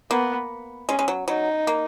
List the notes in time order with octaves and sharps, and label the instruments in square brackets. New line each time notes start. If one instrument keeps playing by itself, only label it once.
[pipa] A#3 [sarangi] B3
[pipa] G#3 [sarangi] C#4
[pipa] G#3
F#3
[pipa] F#3 [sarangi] D#4
[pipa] A#3